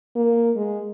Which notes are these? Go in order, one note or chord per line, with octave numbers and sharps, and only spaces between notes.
A#3
G#3